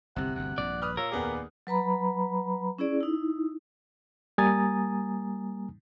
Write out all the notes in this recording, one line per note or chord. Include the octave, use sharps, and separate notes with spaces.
G1 C2 C3 F#5
G1 D2 F#5
A#1 G2 D5
B4 D#6 F6 F#6
A#2 F4 A#4 C#5 E6
D#2 B3 G#4 D5
F#3 B4 A#5 B5
C#4 E4 G#4 D5
D#4 E4
G3 A#3 G#5 A#5 D#6 A6